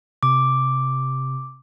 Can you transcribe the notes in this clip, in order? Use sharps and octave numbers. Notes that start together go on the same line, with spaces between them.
C3 D6